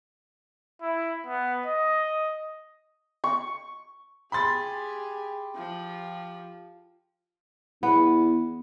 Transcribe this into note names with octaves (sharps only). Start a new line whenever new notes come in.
E4
B3
D#5
C#6
G4 G#4 B5 C6 A6
F3
E2 B3